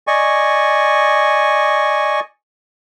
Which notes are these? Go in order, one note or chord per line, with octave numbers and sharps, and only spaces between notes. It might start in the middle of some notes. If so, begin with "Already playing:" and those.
D5 D#5 G#5 C#6